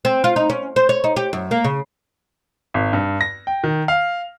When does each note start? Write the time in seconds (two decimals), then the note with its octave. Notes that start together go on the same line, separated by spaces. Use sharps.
0.05 C4
0.24 F4
0.36 D#4
0.50 C#4
0.76 C5
0.89 C#5
1.04 D#4
1.16 G4
1.33 F#2
1.51 A#3
1.64 C#3
2.74 G#1
2.93 G2
3.21 A#6
3.47 G5
3.64 D#3
3.88 F5